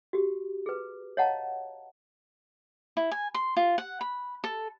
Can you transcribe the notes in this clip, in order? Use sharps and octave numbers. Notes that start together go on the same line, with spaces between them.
F#4 G4
G#4 B4
C#5 D#5 F5 F#5 A5 A#5
E4
G#5
C6
F4
F#5
B5
A4